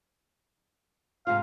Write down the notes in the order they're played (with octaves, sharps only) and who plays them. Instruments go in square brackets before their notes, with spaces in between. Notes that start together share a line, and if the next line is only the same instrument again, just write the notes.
[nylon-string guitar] G#2 C3 F4 [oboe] F5